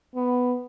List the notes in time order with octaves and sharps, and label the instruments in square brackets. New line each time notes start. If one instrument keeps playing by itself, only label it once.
[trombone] B3